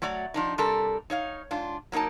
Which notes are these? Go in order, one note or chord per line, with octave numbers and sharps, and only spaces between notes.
F#3 A3 F#4 D5
F3 D4 D#4
C3 G3 D4 A4 A#4
D#4 C#5 F5
G#2 D4 F4
F#3 A#3 D#4 A#4 A5